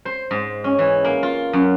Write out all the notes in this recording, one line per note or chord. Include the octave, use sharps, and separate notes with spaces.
C5
G#2
C#4
E3
A#3
F4
F#2